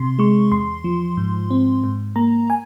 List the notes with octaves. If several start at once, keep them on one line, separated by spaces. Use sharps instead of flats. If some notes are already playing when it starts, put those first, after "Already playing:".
Already playing: C3 C6
G#3 C#6
E2 C6
F3
G#2
C4
G#2
A#3 A#5
G#5